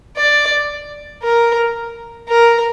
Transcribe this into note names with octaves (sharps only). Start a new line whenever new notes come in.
D5
A#4
A#4